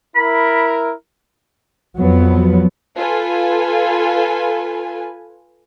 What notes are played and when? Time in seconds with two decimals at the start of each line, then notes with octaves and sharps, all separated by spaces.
0.15 E4 A#4 B5
1.99 F2 F3 F#3 B3
2.96 F4 A4 B4 G#5